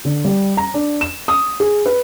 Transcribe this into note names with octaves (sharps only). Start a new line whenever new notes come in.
D3
G3
A#5
D4
E7
D#6
G#4
B4